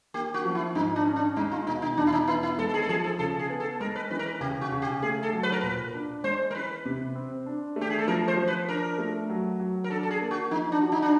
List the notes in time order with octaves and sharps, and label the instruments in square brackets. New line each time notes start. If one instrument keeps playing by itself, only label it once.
[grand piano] A#3 [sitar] G4
[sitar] F#4
[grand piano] F3
[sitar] E4
[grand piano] G#2 [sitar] D#4
[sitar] D4
[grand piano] C#4
[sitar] D4
[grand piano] G#3 [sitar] D#4
[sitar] F4
[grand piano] B2 [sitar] D#4
[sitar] D#4
[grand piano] E2 [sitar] D4
[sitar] E4
D#4
[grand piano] B3 [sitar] E4
[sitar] E4
[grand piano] G#3 [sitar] A4
[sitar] A4
G#4
A4
[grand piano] F3 [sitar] G#4
[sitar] A4
[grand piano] C#3 [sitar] A4
[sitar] G#4
[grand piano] B3
[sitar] A4
[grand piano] G#3 [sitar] A#4
[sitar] B4
[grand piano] E3 [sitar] B4
[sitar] A#4
B4
[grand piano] C#3 [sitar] G4
[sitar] F#4
[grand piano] C#3
[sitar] G4
[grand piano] A3 [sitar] G#4
[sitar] A4
[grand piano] F#3
[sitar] B4
A#4
[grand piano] A#2 [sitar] B4
[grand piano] D4
[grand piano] G#3 [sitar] C5
[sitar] A#4
[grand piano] E3 [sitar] B4
[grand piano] C3
C4
D4
A3
[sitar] G4
G#4
A4
[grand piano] F3 [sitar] A#4
[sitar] C5
[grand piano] F3
[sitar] B4
[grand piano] D4 [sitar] A#4
[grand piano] A3
F#3
F#3
[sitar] A#4
[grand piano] D4 [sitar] A4
[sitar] A4
G#4
[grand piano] A#3
[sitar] F#4
[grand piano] F3 [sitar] D#4
[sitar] D4
[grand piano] F#4
[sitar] D#4
D4